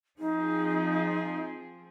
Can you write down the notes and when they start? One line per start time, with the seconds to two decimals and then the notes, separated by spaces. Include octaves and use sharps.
0.19 F3 C4 D#4 G#4